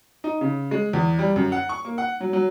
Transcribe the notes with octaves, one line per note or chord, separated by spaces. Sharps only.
D#4
C#3
G#3
E2
G3
F#2
F#5
C#6
A#3
F#5
F#3
F#3